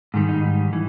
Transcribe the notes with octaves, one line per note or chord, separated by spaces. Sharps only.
G#2 D#3 G3
D#4
E3